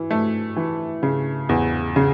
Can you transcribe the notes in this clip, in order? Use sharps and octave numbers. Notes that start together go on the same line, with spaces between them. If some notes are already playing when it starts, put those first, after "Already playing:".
Already playing: E3
A3
E3
C#3
E2
C#3